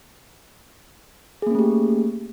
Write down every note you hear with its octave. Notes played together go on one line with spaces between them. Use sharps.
A3 A#3 C#4 G4 G#4